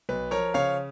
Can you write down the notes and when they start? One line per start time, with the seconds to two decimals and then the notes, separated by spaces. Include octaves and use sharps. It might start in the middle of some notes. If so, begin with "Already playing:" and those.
0.09 B1 B4
0.31 F3 A#4 C#5
0.54 C#3 C#5 F5